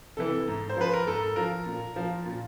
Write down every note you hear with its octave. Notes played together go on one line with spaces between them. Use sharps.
C3 E3 A4
G#2
C5
F3 B4
A#4
G#2 A4
F3 A#4
A#2
F3
A#2